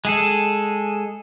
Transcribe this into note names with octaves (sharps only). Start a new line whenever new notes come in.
G#3 G#4 A4